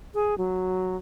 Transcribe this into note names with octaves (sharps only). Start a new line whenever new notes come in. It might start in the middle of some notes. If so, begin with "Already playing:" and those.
G#4
F#3